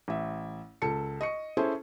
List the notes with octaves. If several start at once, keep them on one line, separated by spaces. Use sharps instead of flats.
A1 E5
C#2 A4 A5 C#7
D#5 C#6 C#7
C#4 E4 G#4 A4 C5